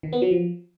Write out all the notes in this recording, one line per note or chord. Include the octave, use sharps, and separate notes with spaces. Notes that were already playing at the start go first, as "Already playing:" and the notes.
D#3
B3
F#3
F3